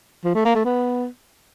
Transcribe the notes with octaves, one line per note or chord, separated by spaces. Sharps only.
F3
A3
A#3
A3
B3